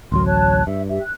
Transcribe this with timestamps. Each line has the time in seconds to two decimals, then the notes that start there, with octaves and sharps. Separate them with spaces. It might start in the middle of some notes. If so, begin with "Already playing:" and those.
0.12 A1 D2 F#3 A#4 C6
0.26 C#5 A5 F#6
0.67 G2 E5
0.88 G4 E5
1.01 F#6